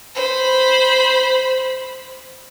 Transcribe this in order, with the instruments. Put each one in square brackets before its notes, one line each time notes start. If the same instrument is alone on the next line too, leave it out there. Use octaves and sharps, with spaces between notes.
[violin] C5 B5